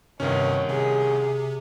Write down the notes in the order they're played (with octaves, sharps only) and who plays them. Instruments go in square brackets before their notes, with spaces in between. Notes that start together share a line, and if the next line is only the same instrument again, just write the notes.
[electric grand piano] C2 D#3 C#4 [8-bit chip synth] G2 C3 [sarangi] C#5
[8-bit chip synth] C3 [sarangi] G#4